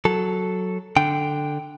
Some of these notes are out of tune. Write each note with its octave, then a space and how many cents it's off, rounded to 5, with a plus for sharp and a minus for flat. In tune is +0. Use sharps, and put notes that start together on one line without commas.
F#3 +0 A4 +0
D3 +5 G5 +0